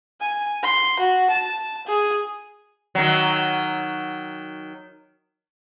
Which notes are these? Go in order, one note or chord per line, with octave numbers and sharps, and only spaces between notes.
G#5
C6
F#4
A5
G#4
D#3 F#3